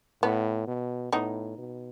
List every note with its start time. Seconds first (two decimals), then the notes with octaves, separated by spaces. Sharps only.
0.23 A2 B3
0.67 B2
1.12 A2 B3 D#4
1.58 B2